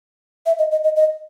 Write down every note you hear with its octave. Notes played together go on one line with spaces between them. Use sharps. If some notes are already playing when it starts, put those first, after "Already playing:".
E5
D#5
D#5
D#5
D#5